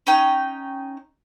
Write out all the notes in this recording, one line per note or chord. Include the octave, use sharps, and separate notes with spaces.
C#4 D#4 G5